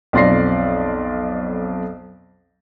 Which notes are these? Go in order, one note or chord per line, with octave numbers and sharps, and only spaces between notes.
B1 F2 D5 C6 A#6 C7